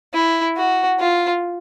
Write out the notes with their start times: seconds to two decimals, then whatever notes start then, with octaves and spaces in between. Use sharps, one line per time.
0.14 E4
0.56 F#4
0.99 F4